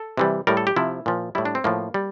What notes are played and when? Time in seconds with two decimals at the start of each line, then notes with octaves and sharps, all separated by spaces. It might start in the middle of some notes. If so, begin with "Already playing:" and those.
Already playing: A4
0.17 C3 E3 G3
0.47 A2 G3 A#4
0.57 A4
0.67 G4
0.76 C3 F3 E4
1.06 A#2 F3
1.35 A2 G3 E4
1.45 D4
1.55 C4
1.64 A2 F3 A#3
1.94 G3